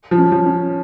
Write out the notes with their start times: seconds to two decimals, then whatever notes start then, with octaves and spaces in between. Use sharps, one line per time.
0.11 F3
0.18 C#4
0.32 F3
0.46 C#4